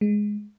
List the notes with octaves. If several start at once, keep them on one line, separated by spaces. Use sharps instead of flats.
G#3